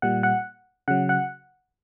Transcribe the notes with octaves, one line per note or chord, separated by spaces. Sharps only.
A#2 G3 F#5
F#5
C#3 F#3 F#5
F#5